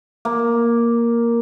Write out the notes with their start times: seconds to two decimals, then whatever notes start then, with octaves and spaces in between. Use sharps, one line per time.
0.25 A#3